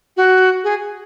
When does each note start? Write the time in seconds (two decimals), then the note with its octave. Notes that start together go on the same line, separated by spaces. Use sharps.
0.17 F#4
0.64 G#4